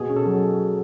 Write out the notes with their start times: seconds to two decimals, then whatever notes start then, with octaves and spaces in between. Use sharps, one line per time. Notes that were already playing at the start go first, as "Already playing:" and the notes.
Already playing: B2 G#4
0.09 C#4
0.16 A4
0.26 F#3